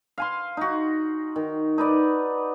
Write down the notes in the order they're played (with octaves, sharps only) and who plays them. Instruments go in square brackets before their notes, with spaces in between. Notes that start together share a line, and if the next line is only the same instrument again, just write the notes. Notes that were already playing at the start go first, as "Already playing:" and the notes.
[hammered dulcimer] F5 G#5 C6
D#4 F#4
D#3
D#4 B4 D5